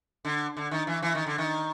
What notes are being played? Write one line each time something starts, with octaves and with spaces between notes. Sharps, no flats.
D3
D3
D#3
E3
E3
D#3
D3
D#3